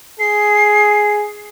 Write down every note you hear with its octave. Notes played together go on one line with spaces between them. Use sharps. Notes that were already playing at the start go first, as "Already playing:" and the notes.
G#4 C7